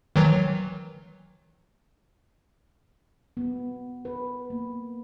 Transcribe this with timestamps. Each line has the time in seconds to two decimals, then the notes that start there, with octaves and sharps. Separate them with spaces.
0.16 D#3 E3 F#3
3.37 B3
4.05 B4
4.50 A#3